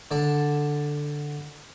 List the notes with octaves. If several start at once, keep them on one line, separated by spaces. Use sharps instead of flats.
D3 D5 A5